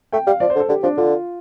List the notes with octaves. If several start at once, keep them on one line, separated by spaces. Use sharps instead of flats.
A3 G5
G3 F5
F3 D5
C5
D3
A4
D3 G4
F3 D4
D3 F4